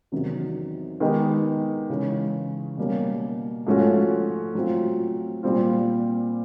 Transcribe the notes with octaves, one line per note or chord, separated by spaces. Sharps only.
E2 C3 D#3 F#3
D#3 G#3 B3 D#4 G4
C#3 E3 G#3 C#4
B2 G3 A#3 C#4
G#2 F3 A3 C#4 F#4
A2 F#3 A3 C4 F4
A#2 G3 C4 F4